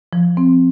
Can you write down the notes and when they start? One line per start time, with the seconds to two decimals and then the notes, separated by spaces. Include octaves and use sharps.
0.13 F3
0.37 C4